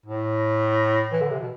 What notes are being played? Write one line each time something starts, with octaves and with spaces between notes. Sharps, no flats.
A2
E3
D3
C3
B2